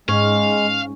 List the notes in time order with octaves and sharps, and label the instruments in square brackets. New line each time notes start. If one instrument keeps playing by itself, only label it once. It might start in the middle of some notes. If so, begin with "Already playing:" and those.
[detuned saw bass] G#2 [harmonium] G#3 [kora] C#4 [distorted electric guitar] F5